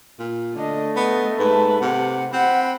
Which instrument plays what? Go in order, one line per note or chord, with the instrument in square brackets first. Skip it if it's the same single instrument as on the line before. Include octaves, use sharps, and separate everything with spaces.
[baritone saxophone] A#2
[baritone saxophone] D3 [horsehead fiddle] A3 [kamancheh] D4 D#5
[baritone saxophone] B3 [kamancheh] D#5
[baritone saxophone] G#2 [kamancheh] B4 A5
[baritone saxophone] C3 [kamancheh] F#5
[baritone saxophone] C4 [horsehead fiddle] F#5 [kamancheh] B5